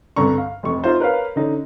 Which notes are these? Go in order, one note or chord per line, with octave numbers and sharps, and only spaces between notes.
C2 G2 D3 A#5 C#6
F5
F1 F2 C#6
D#4 F4 C5
A#4 B4 C#5 F5
D3 C#4 D#4